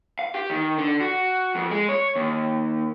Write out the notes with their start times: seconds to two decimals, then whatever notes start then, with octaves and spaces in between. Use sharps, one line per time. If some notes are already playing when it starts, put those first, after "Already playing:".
0.19 F5
0.34 G4
0.50 D#3
0.78 D3
1.01 F#4
1.55 F2
1.71 G#3
1.89 C#5
2.16 D#2